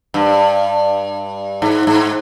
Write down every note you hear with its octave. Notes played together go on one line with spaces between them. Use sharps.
G2
G#2
G#2